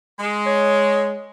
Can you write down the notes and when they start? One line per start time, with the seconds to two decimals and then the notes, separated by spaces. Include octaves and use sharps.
0.20 G#3
0.46 C#5